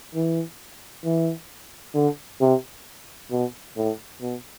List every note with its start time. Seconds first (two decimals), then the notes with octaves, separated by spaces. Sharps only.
0.15 E3
1.04 E3
1.95 D3
2.41 C3
3.31 B2
3.77 A2
4.22 B2